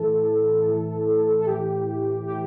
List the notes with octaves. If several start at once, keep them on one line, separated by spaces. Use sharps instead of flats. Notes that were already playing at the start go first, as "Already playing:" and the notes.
Already playing: A2 E3 A4
A2 E3
A4
A2 E3 G4
A2 E3 G4